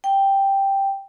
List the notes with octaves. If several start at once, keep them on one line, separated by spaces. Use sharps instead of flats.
G5